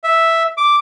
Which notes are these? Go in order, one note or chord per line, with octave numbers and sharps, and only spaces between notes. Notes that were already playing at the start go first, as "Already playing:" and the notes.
E5
D6